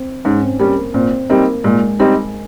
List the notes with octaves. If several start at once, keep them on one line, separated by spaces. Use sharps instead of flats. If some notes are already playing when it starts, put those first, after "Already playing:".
Already playing: C4
G#2 C#4
C4
G3 A#3 C#4
A#3
A#2 C4
G3 A#3 C4 D#4
A#2 G#3
G3 C4 D#4